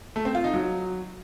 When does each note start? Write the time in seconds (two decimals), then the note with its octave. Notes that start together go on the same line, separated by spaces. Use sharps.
0.16 A3
0.25 C4
0.35 F4
0.44 D#4
0.54 F#3